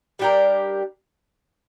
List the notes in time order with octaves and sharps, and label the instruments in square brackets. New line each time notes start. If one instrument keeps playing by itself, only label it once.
[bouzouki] G3 D4 G4 A#4